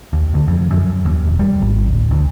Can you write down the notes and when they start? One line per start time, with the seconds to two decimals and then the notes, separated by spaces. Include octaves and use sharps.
0.13 D#2
0.34 D2
0.48 F2
0.71 F#2
1.05 D#2
1.27 E1
1.39 G3
1.62 G#1
1.88 D1
2.11 D2